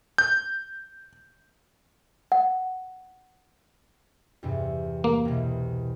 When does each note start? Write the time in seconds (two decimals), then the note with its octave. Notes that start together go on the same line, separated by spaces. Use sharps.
0.18 G6
2.32 F#5
4.43 E2 G2 C3
5.04 A#3
5.25 C2 B2